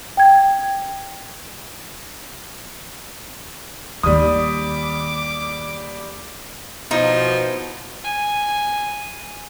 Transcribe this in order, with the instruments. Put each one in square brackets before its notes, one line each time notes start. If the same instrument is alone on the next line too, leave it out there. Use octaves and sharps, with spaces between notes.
[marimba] G5 G#6
[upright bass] D#2 D#3 [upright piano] G3 D#6 [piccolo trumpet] D6
[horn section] B2 [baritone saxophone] F3 [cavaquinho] D#4 [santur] E4 C5
[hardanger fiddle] G#5